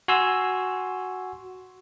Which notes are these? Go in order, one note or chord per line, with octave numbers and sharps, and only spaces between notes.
F#4 G#5 C6 E6